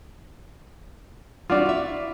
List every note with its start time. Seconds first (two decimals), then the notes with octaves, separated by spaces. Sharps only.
1.50 G3 C4 D4 F4 F#4 D5
1.66 E4 E5